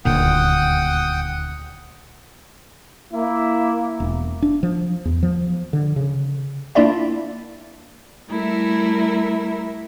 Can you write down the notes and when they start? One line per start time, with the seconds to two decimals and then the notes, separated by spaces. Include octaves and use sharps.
0.05 D#1 D2 A#2 F#5 G5 D#6
3.13 A#3 E4
4.00 E1
4.42 D4
4.63 F3
5.05 E2
5.23 F3
5.73 D3
5.96 C#3
6.75 A#3 D4 E4 F4 D5 E5
8.29 G3 A3 E4 A#4 E5